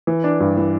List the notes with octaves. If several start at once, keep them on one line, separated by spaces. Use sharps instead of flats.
E3
D4
G2
E3